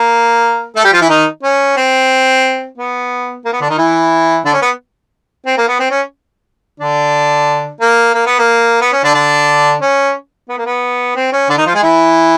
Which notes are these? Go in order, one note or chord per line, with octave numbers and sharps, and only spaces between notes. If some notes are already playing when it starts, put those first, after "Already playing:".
Already playing: A#3 A#4
A3 A4
G3 G4
F3 F4
E3 E4
D#3 D#4
C#4
C4
B3
A#3
B3
D3 D4
D#3 D#4
E3 E4
D3 D4
C#4
B3
C4
A#3
B3
C4
C#4
D3 D4
A#3
A#3
B3
A#3
B3
C#4
D3 D4
D3 D4
C#4
B3
A#3
B3
C4
C#4
D3 D4
D#3 D#4
F3 F4
G#3 G#4
E3 E4